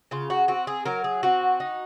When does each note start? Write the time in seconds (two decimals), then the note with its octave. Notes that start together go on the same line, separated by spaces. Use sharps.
0.11 C#3 F4
0.30 F#4
0.48 C4 F#4
0.67 G#4
0.85 F#3 A#4
1.04 G#4
1.23 C4 F#4
1.60 D#4